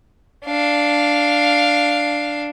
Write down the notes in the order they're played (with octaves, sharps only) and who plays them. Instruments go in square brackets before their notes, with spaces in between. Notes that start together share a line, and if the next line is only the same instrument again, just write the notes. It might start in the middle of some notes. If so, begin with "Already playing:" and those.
[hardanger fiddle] D4 F5